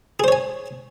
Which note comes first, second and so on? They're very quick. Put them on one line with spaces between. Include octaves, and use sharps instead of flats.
G#4 C5 C#5 G#5